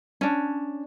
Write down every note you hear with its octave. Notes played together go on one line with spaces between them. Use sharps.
C#4 D4